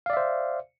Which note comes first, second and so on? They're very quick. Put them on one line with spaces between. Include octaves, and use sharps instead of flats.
F5 D5 E5 C5